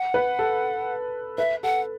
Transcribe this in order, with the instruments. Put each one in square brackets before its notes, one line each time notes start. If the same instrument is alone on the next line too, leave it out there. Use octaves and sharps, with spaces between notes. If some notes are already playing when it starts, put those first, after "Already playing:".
Already playing: [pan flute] F#5
[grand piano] B4
A4
[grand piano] B4 [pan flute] E5
[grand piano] A4 [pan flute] F#5